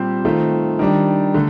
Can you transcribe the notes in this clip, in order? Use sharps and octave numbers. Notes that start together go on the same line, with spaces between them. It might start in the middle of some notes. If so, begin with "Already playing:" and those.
Already playing: A#2 G3 C4 G4 C5
D#3 A3 C4 F4
D#3 G3 D4
D3 A3